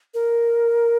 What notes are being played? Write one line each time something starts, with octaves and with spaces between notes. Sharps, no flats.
A#4